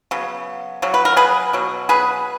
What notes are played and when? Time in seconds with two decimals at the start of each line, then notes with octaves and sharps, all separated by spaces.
0.11 C#3 F#3 B3
0.82 C#3 F#3
0.94 B4
1.05 A#4
1.17 G#4 B4
1.53 B2 F#3
1.89 G#4 B4